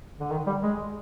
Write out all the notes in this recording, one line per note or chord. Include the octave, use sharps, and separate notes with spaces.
D3
D#3
G3
G#3